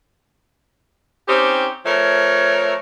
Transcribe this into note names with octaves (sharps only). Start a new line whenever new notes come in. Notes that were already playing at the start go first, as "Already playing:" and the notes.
C4 C#4 D#4 G4
F3 A3 A#4 C#5